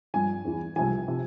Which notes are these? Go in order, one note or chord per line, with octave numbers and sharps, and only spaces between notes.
G2 F3 G#5
E2 E3
C2 C3 F3 G#5
C3 F3